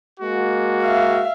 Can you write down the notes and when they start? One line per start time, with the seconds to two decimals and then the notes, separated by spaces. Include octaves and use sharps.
0.20 G#3 A#3 F#4
0.83 E5 F5